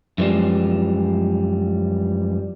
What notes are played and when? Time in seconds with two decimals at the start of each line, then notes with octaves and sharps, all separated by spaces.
0.18 F#2 E3 F3 G3 G#3